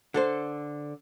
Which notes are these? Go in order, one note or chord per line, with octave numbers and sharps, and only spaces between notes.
D3 A4 C5